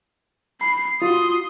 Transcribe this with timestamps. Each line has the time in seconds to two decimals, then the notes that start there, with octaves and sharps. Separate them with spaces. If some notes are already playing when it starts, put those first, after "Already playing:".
0.61 B5 C7
1.02 F4 F#4 C6 D#6